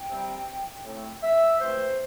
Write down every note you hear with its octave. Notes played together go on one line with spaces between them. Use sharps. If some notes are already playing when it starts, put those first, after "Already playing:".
Already playing: G5
C3 G3 C4
A2 A3 C4
E5
C3 E3 A3 C4 C5